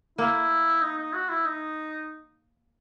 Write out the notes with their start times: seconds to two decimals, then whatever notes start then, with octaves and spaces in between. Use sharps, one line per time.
0.18 A#3 E4
0.81 D#4
0.97 D#4
1.13 F#4
1.29 E4
1.45 D#4